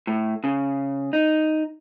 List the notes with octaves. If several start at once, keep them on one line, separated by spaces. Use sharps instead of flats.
A2
C#3
D#4